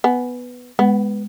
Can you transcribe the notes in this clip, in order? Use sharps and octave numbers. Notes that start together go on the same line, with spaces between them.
B3 G#5
G#3 B3